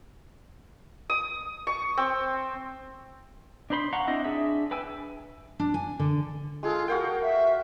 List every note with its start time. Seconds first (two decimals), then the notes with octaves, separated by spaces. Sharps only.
1.10 D#6
1.67 C#6
1.97 C4
3.70 D4 D#4 C5 B5 C6
3.93 F5 F#5 A#5 C6 C#6
4.07 C4 D4 E4 C5 D#5
4.24 D4 G#4 E5
4.71 B4 G5 G#5 E6
5.60 D4
5.74 G#5
5.99 D3
6.63 G#3 F4 G#4 A4
6.88 F#4 A#4 F5 G5
7.21 E5